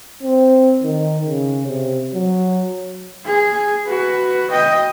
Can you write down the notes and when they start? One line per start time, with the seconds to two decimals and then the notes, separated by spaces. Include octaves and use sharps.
0.23 C4
0.83 D#3
1.26 C#3
1.67 C3
2.14 F#3
3.25 G#4
3.87 F#4 B4
4.50 D#5 G5